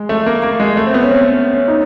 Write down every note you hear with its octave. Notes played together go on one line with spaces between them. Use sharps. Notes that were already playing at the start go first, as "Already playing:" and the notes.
Already playing: G#3
A3
A#3
A#3
G#3
A3
C4
B3
C#4
C4
C#4
C#4
D#4